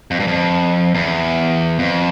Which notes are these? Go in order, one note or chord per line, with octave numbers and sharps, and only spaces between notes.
F2
G2
F2
E2
F2